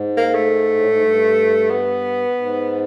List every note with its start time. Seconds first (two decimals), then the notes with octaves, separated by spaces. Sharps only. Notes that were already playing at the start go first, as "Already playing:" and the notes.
Already playing: G#2
0.17 A#3
0.34 A3
0.75 A2
0.89 G#2
1.03 G2
1.70 B3
2.39 G#2